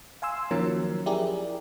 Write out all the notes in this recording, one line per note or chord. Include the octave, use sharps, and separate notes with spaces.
F5 G#5 C6 E6
D#3 F3 F#3 A#3 C#4 A#4
E4 G4 G#4 A#4 D5